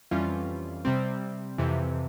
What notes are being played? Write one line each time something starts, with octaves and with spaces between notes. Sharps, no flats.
F2 E3 G3 C#4 F4
C3 G3 C4
F2 C3 E3